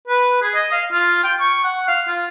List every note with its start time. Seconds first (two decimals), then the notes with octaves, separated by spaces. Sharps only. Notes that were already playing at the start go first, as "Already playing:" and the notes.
0.08 B4
0.42 G#4
0.55 D#5
0.72 F5
0.92 F4
1.24 G5
1.40 C#6
1.64 F#5
1.88 F5
2.08 F4